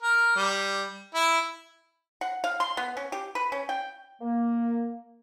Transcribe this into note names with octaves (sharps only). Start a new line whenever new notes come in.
A#4
G3
E4
F#5
F5
C6
B3
C#4
G4
B4
C#4
G5
A#3